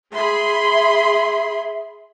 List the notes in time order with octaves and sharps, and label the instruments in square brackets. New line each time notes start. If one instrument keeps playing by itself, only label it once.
[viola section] G#4 B5 C6 [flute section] E5